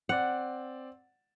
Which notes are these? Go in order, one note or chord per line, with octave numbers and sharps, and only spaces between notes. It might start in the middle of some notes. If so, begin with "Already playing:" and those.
C4 D5 F#5